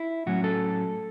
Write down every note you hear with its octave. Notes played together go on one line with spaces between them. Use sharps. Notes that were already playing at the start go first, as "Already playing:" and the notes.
Already playing: E4
A2 F#3 C#4 F#4
A4